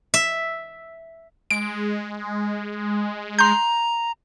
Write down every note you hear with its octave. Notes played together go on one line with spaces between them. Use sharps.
E5
G#3 D7
A#5 C6 G6